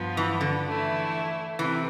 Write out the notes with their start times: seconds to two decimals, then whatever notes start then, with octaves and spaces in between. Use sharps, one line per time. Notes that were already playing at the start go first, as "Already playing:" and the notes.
Already playing: G2 F3 B3
0.17 E3
0.41 D3
0.65 E3 A3 E4
1.59 C3 E3